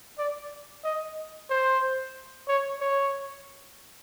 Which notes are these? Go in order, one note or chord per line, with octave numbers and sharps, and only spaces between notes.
D5
D#5
C5
C#5
C#5